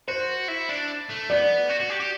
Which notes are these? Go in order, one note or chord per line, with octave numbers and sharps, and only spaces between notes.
F#4 C5
E4
D4
A3
B3 D5
F#4
F#4
G4
G4